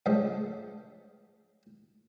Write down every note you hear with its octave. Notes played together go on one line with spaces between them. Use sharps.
G2 C#3 F3 G#3 A3